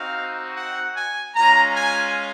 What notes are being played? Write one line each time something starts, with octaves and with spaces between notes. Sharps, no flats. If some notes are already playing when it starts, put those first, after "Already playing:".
Already playing: C4 D#4 F#4 F5
F#5
G#5
G#3 C#4 F4 A#5
G#5